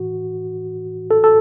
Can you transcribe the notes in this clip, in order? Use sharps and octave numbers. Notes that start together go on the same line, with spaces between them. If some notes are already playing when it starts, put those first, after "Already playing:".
Already playing: A2 E3 F#4
A4
A4